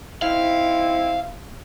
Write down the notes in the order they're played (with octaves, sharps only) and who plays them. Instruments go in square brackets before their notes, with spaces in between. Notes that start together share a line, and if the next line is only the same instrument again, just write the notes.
[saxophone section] C4 D#4 E4 [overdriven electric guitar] F5